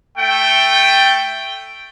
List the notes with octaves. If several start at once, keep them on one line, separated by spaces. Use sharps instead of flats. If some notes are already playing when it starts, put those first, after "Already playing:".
A3 G5